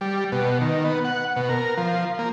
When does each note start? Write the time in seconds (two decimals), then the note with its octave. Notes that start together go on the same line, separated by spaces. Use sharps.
0.01 G3
0.32 B2
0.61 D#3
0.85 B3
1.05 F#5
1.36 B2
1.49 A#4
1.77 F3
2.19 A#3